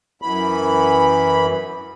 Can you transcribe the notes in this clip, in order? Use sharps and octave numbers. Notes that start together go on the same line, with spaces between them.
F#2 E3 B5